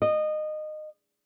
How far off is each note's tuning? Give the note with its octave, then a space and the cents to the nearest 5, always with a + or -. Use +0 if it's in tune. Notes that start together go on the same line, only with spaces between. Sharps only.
D#5 -20